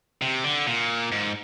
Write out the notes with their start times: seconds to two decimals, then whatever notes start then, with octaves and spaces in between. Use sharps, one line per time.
0.22 C3
0.44 D3
0.67 A#2
1.12 G#2